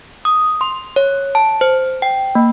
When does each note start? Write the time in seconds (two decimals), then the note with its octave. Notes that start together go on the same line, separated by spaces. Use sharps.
0.25 D#6
0.61 C6
0.96 C#5
1.35 A5
1.61 C5
2.02 G5
2.35 A#3